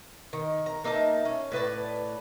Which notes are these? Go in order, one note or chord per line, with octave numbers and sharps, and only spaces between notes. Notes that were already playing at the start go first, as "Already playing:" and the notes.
D#3
A#5
A#3 D#4 E5 A5
C#4
A2 B4 D5 A5